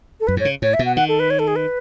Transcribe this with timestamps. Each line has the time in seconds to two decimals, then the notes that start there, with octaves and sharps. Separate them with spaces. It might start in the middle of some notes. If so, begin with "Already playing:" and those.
0.20 A4
0.27 F#2 B4
0.37 G#2 C#5
0.45 C#3
0.62 A2 C#5
0.74 E5
0.79 B2
0.86 F#5
0.96 D#3 F#5
1.08 A4
1.19 B4
1.30 C#5
1.39 A4
1.48 G#4
1.56 B4